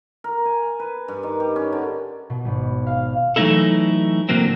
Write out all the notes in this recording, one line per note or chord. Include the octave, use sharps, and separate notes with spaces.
A#4
G#5
B4
G2
D#3
G4
C#4
D3
B2
G#1
F5
E3 F#3 A3 D#4 E4 A4
A#2 D3 F#3 A#3 C4